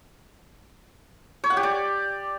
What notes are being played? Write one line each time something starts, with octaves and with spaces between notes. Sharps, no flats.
C#5
F#5
G4
D5